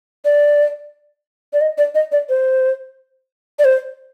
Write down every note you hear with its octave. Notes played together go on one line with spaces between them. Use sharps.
D5
D5
D#5
D5
D#5
D5
C5
D5
C5